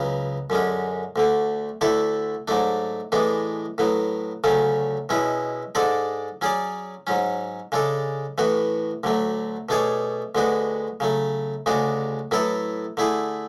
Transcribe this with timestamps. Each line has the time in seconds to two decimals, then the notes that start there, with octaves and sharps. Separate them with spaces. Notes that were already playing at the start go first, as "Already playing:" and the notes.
Already playing: C#2 C#3 F#3 B3
0.50 F#2 D3 G#3 C#4
1.16 D2 D3 A3
1.81 D2 D3 A3 E4 A4
2.48 G#2 F#3 A3 D4
3.12 A2 E3 G#3 B3 D4
3.78 A2 F#3 B3
4.44 D2 C#3 F#3 A3 C#4
5.09 B2 G#3 C#4 E4
5.75 G#2 G#3 D4 A4 D5
6.41 F#3 C#4 G#4 D5
7.07 G#2 F#3 C#4
7.72 C#3 G#3 D4 A4
8.38 A2 E3 B3 F#4
9.04 D2 D3 F#3 A3
9.69 B2 A3 D4 G#4 C#5
10.35 D2 D3 G#3 B3 F#4
11.00 C#3 F#3 A3
11.66 D2 C#3 G#3 D4 F#4
12.31 A2 F#3 B3 E4 A4
12.97 D3 A3 E4 G#4